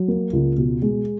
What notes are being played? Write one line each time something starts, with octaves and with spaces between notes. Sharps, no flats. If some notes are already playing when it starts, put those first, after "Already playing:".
Already playing: F#3
A#3
C#2
B2
G#3